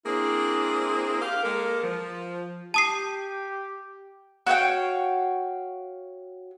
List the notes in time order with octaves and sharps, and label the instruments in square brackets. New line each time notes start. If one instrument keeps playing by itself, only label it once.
[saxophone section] A#3 C4 D4 E4 G#4
G4 F5
G#3 A#3 A4 A#4
F3
[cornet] G4 [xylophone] A5 D#6 C7
[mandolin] F#4 C#5 F5 G5